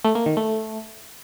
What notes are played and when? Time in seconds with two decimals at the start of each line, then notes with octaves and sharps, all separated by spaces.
0.04 A3
0.15 A#3
0.26 D#3
0.37 A3